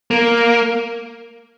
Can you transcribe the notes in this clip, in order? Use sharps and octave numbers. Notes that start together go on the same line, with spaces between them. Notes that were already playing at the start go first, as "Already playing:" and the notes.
A#3